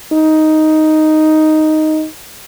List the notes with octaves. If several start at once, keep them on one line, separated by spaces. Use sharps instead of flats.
D#4